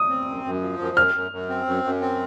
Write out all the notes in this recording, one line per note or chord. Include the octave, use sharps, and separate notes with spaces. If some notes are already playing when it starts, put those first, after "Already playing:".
Already playing: D#6
C4
F#2
F#2
F3
F#2
F#2 F6
F#2
F#2
C4
F#2
F#2
C4